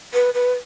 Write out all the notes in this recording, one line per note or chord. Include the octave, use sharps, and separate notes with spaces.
B4
B4